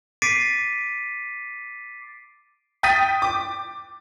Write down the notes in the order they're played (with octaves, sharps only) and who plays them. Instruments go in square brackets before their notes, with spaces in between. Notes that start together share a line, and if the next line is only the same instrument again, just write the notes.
[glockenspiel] D6 A6 B6 C7 D7 D#7
[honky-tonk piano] G5 D#6 G6 A6 B6 D#7
D6